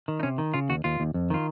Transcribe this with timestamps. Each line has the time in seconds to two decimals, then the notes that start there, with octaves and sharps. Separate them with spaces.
0.08 D#3
0.20 D#4
0.23 C3 C#4
0.38 D#3
0.54 C#3 F4
0.69 D#2 F#4
0.84 D#2 F4
1.00 D#2
1.14 F2
1.30 D#3 F4